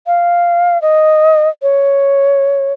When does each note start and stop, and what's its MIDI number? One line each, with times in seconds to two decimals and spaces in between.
0.07 0.81 77
0.82 1.49 75
1.62 2.73 73